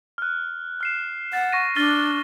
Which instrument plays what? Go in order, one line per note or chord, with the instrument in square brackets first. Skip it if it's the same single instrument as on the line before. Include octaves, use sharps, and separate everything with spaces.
[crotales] F6 F#6
F6 C7 E7
[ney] F#5 [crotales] A6
[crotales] C#6 A#6 D#7
[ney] D4 [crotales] F6 A6 G7